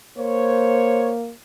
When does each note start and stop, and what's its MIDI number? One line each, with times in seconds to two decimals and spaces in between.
0.18 1.31 58
0.18 1.12 72
0.18 1.12 73